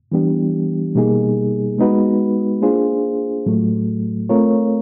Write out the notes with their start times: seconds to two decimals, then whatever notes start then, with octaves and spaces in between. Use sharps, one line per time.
0.12 E3 G3 B3 D4 G4
0.95 B2 G3 A#3 D#4 G#4
1.78 G#3 B3 D#4 F#4 B4
2.62 A#3 D4 F4 G#4 C5
3.46 A2 F#3 A3
4.29 A3 C4 F4 A#4 C#5